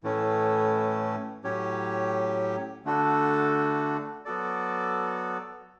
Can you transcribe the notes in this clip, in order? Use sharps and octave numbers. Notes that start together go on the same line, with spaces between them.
A2 E3 A3 C#4
A2 F#3 C#4 G4 C#5
D3 A3 D4 F#4 A4
F#3 B3 F#4 A4 D5